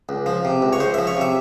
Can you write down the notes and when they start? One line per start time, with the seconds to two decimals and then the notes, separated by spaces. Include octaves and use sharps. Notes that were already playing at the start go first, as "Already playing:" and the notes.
0.09 C#2
0.26 F3
0.45 C3
0.62 C#2
0.73 C#5
0.80 C#2 C5
0.94 F3 E5
1.07 C#5
1.17 C3 E5